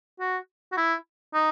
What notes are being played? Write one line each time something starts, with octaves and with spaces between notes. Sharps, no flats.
F#4
F#4
E4
D#4